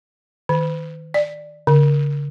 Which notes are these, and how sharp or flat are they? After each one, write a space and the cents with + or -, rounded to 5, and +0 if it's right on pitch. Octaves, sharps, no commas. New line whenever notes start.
D#3 +10
D5 +10
D3 -40